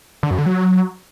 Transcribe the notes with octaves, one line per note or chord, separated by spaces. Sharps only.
D3
F#2
D3
F#3